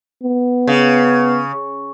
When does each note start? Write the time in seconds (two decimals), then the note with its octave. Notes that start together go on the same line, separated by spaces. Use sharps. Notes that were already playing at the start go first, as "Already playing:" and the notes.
0.23 B3
0.67 C#3